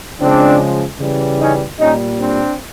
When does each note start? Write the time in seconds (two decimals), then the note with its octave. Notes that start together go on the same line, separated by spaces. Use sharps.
0.21 C#3 F3 G#3 C4 D4
1.00 C#3 E3 G3
1.40 C#4 D#4
1.79 A#2 G3 C#4 D#4
2.19 C4 D4